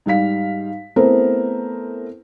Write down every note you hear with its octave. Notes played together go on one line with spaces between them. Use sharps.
G#2 G3 F5 B6
A3 B3 C4 E4 A#4 C5